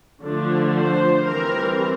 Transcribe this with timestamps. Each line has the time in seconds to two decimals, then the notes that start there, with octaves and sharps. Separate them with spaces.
0.23 D3 F3 A3 D4
0.75 C5
1.26 E3 G3 C4 A#4